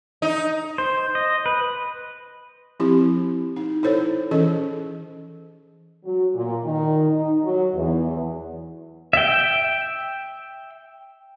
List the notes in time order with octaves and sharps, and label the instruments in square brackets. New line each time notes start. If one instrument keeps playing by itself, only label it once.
[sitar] D#4
[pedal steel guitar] C5
D#5
B4
[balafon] F3 C4 E4 G4
D#4
E4 A4 C5 C#5
E3 C#4 G#4 A4 D#5
[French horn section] F#3
A#2
D#3
D#4
F#3
E2
[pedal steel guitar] E5 G5